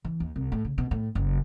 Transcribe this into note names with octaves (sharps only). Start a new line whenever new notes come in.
E3
D#2
C2
A2
C#3
B2
A2
F#1